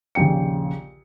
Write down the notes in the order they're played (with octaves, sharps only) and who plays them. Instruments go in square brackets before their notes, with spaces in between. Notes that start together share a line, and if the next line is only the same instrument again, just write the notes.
[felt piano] A#1 D#2 C#3 G5 C#7